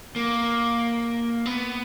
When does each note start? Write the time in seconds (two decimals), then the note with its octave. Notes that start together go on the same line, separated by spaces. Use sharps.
0.16 A#3
1.46 B3